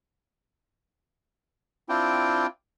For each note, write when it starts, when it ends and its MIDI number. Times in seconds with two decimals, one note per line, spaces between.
1.89 2.47 60
1.89 2.47 62
1.89 2.47 64
1.89 2.47 65
1.89 2.47 79